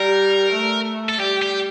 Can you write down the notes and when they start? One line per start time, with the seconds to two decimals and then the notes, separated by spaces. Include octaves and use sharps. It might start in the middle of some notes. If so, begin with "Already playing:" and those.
Already playing: G3 A#4
0.53 A3
1.09 A4
1.19 G3 G4
1.42 G4